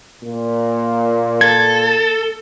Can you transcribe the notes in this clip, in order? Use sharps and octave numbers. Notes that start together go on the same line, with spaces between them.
A#2
A4 G#6